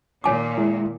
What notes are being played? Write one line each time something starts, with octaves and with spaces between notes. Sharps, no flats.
A#2 D#3 C#5 G#5 D6
G#3 E4